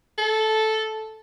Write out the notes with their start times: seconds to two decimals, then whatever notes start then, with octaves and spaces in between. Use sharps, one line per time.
0.18 A4